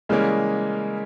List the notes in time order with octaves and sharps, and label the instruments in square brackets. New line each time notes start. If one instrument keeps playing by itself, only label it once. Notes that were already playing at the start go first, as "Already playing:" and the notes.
[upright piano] C#3 E3 G3 A#3 C#4 [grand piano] G#3